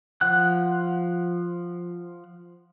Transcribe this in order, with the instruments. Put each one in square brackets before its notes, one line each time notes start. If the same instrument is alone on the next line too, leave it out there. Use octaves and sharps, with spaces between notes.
[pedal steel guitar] F3 F#5 F#6